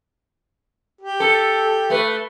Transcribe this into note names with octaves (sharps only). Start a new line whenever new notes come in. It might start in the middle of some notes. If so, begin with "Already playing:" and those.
G4
A4
A3 B4